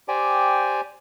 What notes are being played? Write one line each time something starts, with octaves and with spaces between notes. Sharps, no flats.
G4 C5 D5 G5 G#5